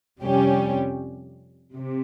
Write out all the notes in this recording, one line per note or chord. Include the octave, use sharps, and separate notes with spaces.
F2 C3 G3 C#4 G4
C3